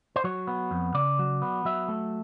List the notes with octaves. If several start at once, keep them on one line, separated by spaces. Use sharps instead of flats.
C5
F#3 C#5
B3
F2
C#3 D5
F#3
B3
F#3 E5
A3